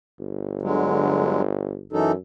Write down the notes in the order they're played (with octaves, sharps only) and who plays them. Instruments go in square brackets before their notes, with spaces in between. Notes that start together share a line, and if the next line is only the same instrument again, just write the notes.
[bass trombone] G1
[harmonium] D3 F#3 G#3
[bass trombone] F#2 [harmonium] E3 D#4 A4